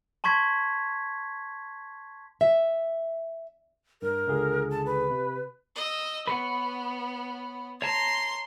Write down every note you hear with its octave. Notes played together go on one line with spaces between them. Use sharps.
A5 C6 C#6 G#6 B6
E5
G2 A#4
C#2 D3 G#4
A5
B4
C3
D#5 E6
B3 B4 C#5 F#5
C#5 A5 A#5 C6